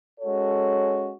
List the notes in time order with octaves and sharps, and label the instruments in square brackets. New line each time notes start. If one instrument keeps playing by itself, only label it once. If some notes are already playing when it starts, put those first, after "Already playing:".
[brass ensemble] G#3 C#4 F#4 A4 C#5